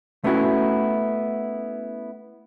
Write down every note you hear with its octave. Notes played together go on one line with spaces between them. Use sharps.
A3 B3 C#4 E4 F#4